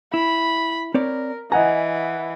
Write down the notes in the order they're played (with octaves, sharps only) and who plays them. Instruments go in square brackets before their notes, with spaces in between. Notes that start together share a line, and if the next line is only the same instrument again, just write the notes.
[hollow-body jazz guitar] E4 [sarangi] B5
[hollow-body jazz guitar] C4 C#5 D5 [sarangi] A#4
[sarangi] E3 [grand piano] D#5 F#5 G#5 [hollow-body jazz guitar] A#5